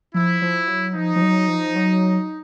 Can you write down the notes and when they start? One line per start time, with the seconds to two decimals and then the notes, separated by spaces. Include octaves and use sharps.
0.14 F3 E4
0.42 F3
0.68 F#3
0.95 F3 D#4
1.16 F3
1.22 F#3
1.48 F3
1.76 F#3